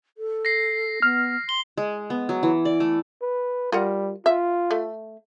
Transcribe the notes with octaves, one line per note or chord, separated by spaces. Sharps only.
A4
A#6 C7
B3 F6
C6 G7
G#3
B3
F#3
E3
D5
A3
B4
G3 F4 A#4 F#5
F4 E5
A3